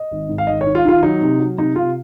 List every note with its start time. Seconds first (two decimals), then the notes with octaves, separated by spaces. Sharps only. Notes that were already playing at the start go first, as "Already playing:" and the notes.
Already playing: D#5
0.11 G#1
0.29 G#2
0.38 F5
0.47 G#1 D#5
0.61 C#5
0.66 D#3
0.75 F4
0.85 D#3 F4
1.03 F#3 D#4
1.21 C3
1.39 F#3
1.58 C3 D#4
1.76 C3 F4